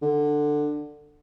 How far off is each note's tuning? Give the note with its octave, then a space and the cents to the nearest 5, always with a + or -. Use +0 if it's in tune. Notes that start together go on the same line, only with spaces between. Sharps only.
D3 +10